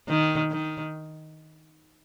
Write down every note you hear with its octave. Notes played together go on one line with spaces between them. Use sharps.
D#3
D#3